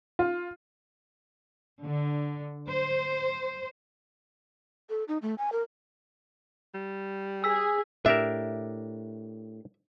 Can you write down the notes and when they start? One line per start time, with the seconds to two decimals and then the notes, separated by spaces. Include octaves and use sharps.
0.19 F4
1.83 D3
2.68 C5
4.90 A4
5.08 D#4
5.22 A3
5.38 G#5
5.52 A#4
6.74 G3
7.44 G#4 E6 B6
8.06 A2 D4 G4 A#4 E5